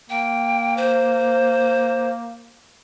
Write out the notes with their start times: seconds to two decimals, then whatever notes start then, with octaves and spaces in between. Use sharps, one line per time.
0.10 A#3 G5
0.77 C5